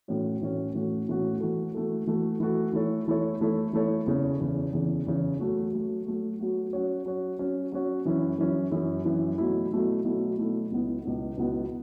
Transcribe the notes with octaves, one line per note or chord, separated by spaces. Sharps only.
A2 E3 A3 C#4 F#4
A2 E3 A3 C#4 F#4
A2 E3 A3 C#4 F#4
A2 E3 A3 C#4 F#4
E3 A3 F#4 A4
E3 A3 F#4 A4
E3 A3 F#4 A4
E3 A3 F#4 A4
E3 A3 E4 A4 C#5
E3 A3 E4 A4 C#5
E3 A3 E4 A4 C#5
E3 A3 E4 A4 C#5
E2 C#3 E3
E2 C#3 E3
E2 C#3 E3
E2 C#3 E3
F#3 A3 F#4
F#3 A3 F#4
F#3 A3 F#4
F#3 A3 F#4
F#3 C#4 F#4 C#5
F#3 C#4 F#4 C#5
F#3 C#4 F#4 C#5
F#3 C#4 F#4 C#5
F#2 E3 C#4 E4
F#2 E3 C#4 E4
F#2 E3 C#4 E4
F#2 E3 C#4 E4
B2 F#3 A3 E4
B2 F#3 A3 E4
B2 F#3 A3 E4
B2 F#3 A3 E4
C#2 B2 F#3 B3 E4
C#2 B2 F#3 B3 E4
C#2 B2 F#3 B3 E4